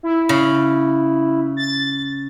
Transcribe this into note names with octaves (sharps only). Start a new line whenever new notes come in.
E4
C#3
A6